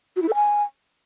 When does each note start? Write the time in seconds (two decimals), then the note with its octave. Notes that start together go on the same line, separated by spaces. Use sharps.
0.16 F#4
0.22 E4
0.28 A4
0.34 G#5